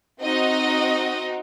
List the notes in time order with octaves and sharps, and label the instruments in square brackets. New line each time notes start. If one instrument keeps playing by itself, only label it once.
[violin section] C4 D#4 F#4 D#5